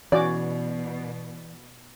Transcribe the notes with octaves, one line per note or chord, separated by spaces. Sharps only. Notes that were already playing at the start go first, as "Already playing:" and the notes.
B2 E3 C#4 F#4 D5 D6